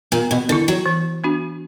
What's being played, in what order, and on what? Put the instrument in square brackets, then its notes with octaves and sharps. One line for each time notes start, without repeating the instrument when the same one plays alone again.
[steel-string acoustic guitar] A#2 [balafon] B3
[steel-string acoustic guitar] B2
[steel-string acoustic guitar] D3 [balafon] A#4
[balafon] E4
[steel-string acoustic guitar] F#3
[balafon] E3
B3 D4 F#4